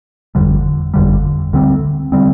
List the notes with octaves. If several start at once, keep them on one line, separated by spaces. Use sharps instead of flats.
G1 F2 D3 G3
G1 F2 D3 G3
D2 D3 G3 C4
D3 G3 C4